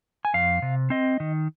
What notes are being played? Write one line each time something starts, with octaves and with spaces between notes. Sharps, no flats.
G#5
F2 F5
C3
C4 D#5
D#3